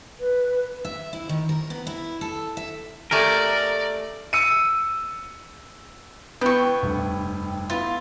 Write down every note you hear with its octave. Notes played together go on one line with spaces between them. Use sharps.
B4
E5
E4
D#3
A#4
B3
E4
A4
E5
A3 G4 A#4 D5 G#5
E6 C#7 D#7
B3 E4 G5 C#6
F1 G2
B3 E4 F4 B4